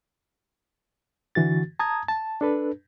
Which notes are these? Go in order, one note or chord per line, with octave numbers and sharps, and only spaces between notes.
D3 E3 F#4 A6
A5 A#5 D#6 G#6
A5
D4 A4 B4